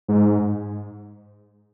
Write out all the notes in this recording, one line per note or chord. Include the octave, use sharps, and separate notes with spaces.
G#2